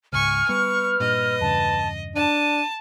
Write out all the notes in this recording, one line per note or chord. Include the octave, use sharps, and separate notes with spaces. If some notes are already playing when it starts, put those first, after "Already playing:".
C#2 G#2 G#5 C#6 F6
G3 B3 B4 C#6
G2 A#2 D#5
E2 G2 C#3 A5
D4 A5 D#7